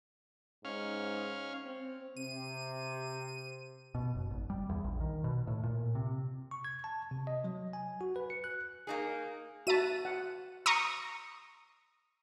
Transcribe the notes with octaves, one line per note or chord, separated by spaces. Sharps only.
G#2 C#4 F5
C4
C3 D#7
B2
F#1
G#1
G3
E2
A#1
D#3
B2
A2
A#2
C3
C#6
G#6
A5
C3
D#5
F#3
G#5
F#4
B4
C#7
F#6
A#3 D#4 G#4
F#4 E5 A5 D#7
F#5
A#5 C6 C#6 D#6